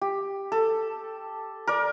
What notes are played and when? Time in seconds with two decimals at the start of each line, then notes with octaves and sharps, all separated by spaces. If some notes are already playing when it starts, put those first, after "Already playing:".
0.01 G4
0.52 A4
1.67 A#4 D5